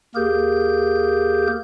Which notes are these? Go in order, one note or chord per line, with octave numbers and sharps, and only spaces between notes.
D#2 A#3 G4 G#4 A#4 G6